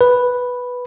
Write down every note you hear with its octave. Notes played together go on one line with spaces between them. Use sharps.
B4